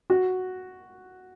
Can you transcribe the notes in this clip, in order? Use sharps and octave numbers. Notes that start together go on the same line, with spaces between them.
F#4